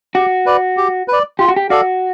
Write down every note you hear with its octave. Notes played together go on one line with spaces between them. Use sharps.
F#4 G4
B4 D5
G4
B4 D5
F4 G4
F#4
G4
F#4 A4 D5 F5